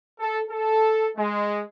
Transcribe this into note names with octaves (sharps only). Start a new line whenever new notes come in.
A4
A4
G#3